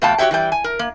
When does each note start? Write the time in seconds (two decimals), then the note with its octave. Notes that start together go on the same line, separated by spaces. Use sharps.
0.02 F2 B2 A3 F5 G5 A5
0.18 F#4 G4 C5 C#5 E5 G5
0.31 E3 G3 G5
0.52 G#5
0.64 A#4
0.79 A#3